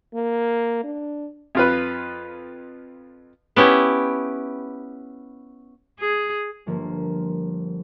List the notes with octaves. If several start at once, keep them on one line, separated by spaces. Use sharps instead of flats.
A#3
D4
F2 F4 B4
B3 C#4 E4 G4
G#4
G1 F3 A#3